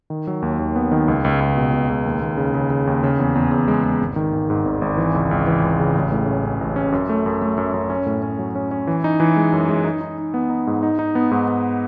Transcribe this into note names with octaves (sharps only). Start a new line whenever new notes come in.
D#3
F#3
D#2
D#2
B3
D#3
C#2
C#2
C#2
B2
B2
C#2
D#2
D#2
C#3
C#3
C#3
D#2
C#3
E2
E2
E2
G#3
G#3
G#1
D#3
G#1
G#2
G#1
G#1
E3
C#2
C#2
E3
C#2
C#3
A1
A2
C#4
C#4
A1
C#4
F#2
A3
F#2
A3
F#2
F#2
C#4
A2
C#4
F#3
C#4
C#4
E3
D#4
E3
G#3
F#2
G#3
D#4
D#4
D#4
B3
D#4
G#2
D#4
D#4
B3
G#2
B3